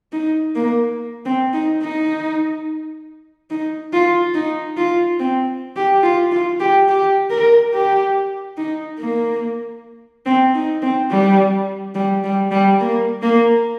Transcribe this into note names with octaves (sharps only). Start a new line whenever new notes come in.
D#4
A#3
C4
D#4
D#4
D#4
F4
D#4
F4
C4
G4
F4
F4
G4
G4
A#4
G4
D#4
A#3
C4
D#4
C4
G3
G3
G3
G3
A#3
A#3